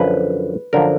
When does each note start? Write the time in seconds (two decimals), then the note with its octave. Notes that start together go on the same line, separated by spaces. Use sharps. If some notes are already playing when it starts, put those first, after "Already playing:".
Already playing: F#2 D3 F3 B4
0.73 F#2 D3 F3 A#4